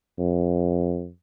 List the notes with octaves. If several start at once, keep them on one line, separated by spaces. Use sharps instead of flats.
F2